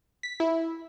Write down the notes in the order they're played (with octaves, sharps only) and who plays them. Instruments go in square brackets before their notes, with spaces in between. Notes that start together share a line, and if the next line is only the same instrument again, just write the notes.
[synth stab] B6
E4